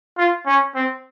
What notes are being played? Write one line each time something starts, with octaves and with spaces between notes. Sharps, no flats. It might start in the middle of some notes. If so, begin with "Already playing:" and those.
F4
C#4
C4